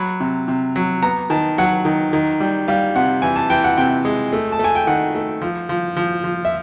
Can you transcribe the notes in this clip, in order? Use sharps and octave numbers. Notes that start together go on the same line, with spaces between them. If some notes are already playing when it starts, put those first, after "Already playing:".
Already playing: F#3 B5
C3
C3
F#3
B3 A#5
D#3 A5
F#3 F#5
D#3
D#3
G3
G3 F5
C3 F#5
E3 G#5
A5
E3 G5
F#5
C3 G5
G#3
A3
A5
A3 G#5
G5
D#3 F#5
A3
F3
F3
F3
F3
E5